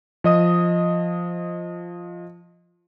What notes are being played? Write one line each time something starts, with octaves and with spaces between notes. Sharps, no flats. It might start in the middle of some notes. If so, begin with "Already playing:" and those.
F3 D#5 D#6